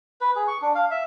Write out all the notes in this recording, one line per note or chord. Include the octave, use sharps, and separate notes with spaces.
B4
G#4
C#6
D4
F5
E5